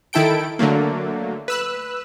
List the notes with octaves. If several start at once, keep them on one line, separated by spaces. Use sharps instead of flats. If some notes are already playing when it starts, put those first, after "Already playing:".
D#3 E4 A4 G5 D7
D3 F#3 A3 A#3
B4 E6 F#6